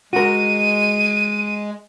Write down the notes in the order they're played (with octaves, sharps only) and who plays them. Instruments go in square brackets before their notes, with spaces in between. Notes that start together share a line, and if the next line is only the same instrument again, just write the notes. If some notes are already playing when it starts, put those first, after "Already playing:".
[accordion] G#3 [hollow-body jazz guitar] F#4 A#4 [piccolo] D#7